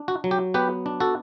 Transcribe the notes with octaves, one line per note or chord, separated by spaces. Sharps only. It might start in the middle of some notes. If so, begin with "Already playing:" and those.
Already playing: D4
F#4
F#3
G4
B3 G4 B4
D4
F#4 A4